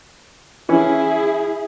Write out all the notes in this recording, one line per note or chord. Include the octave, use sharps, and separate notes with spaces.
E3 C#4 E4 G#4